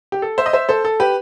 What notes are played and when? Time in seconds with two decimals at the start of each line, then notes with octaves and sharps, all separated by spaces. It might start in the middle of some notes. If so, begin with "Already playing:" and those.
0.12 G4
0.22 A4
0.38 C5 E5
0.46 D#5
0.53 C5 E5
0.69 A4 C5
0.85 A4
1.00 G4 B4